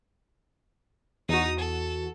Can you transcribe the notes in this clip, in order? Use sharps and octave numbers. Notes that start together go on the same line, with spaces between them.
E2 D#4 F#4 D#6
A4